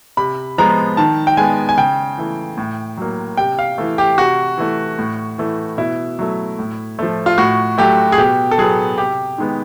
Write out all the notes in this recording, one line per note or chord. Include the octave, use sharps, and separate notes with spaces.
C3 B5
F3 G#3 B3 A#5
D#3 A5
G5
G#3 B3 G#5
G#5
C#3 G5
E3 A3
A2
F#3 A#3
C3 G5
F5
E3 A3
G4
C3 F#4
E3 A3
A2
E3 A3
B2 E4
F#3 A3
A2
F3 A3
F4
A2 F#4
F#3 A3 G4
G#4
B2 G4
A4
F#3 B3 G#4
C3 G4
D#3 G#3 B3